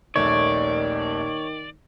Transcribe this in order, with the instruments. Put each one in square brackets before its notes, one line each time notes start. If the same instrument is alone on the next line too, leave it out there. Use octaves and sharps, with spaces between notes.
[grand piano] D#1 A#1 A3 [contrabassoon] D#3 [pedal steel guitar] C#5 [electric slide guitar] D5